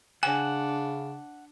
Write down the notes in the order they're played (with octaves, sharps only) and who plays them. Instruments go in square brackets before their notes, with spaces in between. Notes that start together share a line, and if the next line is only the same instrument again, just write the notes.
[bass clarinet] C#3 [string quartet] D4 [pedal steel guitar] F#5 [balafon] G#5